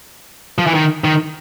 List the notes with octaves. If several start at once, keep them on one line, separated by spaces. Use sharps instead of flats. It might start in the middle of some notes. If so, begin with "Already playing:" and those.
F3
E3
D#3
D#3